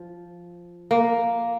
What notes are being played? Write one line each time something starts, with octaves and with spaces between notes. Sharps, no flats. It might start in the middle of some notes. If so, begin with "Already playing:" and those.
Already playing: F3
A#3